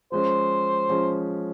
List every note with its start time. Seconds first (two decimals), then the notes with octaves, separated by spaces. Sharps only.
0.12 F3 G#3 C#4 C5
0.89 F3 G#3 C#4